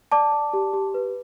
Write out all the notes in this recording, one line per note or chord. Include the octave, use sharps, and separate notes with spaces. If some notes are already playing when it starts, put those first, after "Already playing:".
D5 A5 D6
D5
G4
G4
B4